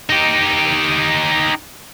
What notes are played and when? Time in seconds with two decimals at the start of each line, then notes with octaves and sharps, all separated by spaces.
0.10 D#4 G4